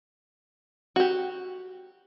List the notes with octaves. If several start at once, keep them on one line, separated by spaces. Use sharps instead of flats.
F#4 G4